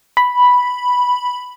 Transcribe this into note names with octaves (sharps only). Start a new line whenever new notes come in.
B5